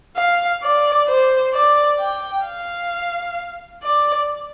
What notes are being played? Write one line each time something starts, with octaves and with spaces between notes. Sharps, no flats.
F5
D5
C5
D5
G5
F5
D5